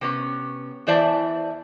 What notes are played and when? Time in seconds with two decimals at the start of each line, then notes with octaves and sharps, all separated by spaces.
0.01 C3 B3 C#4
0.87 E2 E3 C5 D5 E5 A5